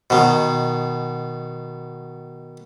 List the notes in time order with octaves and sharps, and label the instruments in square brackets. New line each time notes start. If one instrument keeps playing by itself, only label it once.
[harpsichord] B2 D#3